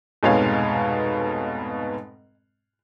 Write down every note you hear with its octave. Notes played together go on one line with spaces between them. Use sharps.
F1 G#2 B2 G#3 C#5 F5